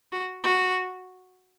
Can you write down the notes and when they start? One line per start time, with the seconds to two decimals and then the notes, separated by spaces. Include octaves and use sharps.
0.12 F#4
0.44 F#4